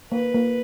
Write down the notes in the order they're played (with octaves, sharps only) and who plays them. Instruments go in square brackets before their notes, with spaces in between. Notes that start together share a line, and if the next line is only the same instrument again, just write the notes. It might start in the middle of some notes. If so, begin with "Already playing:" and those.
[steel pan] A#3 [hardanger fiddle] B4
[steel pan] A#3